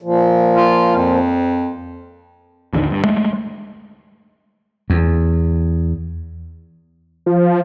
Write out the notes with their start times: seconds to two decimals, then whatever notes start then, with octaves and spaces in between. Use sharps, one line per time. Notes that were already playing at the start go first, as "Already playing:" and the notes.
0.02 A#2 F3
0.56 F4
0.96 F2
2.73 A1 D#2 D3 D#3
2.90 G2
3.04 G#3 A3
4.90 E2
7.26 F3